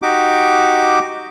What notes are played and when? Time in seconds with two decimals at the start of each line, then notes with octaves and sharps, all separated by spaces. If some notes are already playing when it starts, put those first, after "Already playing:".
0.02 D#4 F#4 G4 D6